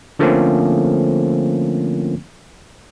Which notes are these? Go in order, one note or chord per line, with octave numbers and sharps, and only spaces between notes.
D3 F3 A3 A#3 C4 C#4